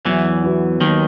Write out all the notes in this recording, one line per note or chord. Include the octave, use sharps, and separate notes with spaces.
E2 E3 F#3
B3 F#4
D#2 D#3 F#3